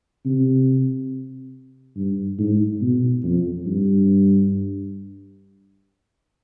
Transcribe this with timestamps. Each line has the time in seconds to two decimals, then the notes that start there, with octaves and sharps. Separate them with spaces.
0.25 C3
1.96 G2
2.39 G#2
2.81 B2
3.24 F2
3.67 G2